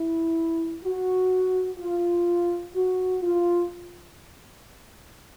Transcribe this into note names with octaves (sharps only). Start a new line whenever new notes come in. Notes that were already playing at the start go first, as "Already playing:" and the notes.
Already playing: E4
F#4
F4
F#4
F4